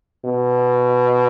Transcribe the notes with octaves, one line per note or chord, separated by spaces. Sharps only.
B2